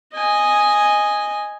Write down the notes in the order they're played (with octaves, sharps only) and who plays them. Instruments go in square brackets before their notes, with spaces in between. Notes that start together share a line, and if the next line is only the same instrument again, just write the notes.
[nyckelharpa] D#5 G#5